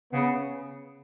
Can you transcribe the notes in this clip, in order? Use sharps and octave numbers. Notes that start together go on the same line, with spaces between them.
C#3 B3